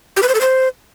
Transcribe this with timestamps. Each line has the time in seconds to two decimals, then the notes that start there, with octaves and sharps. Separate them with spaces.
0.17 G4
0.23 B4
0.29 C5
0.35 A4
0.41 C5